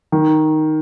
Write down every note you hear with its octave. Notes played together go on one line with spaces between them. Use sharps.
D#3